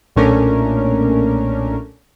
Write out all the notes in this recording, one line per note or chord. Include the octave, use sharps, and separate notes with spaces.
B1 A#2 A3 C#4 D4 A#4